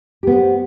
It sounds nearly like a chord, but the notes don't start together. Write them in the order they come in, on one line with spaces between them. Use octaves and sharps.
G4 B3 C5